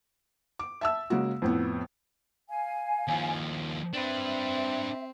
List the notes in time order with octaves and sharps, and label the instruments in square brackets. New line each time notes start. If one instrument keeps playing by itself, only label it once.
[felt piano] D6
E5 A5 E6
C#3 G#3 A#3 F#4
F2 A2 B3
[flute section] F5 G#5
[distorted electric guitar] D#2 F3
[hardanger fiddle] C4 [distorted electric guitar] D4 B4 [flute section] E5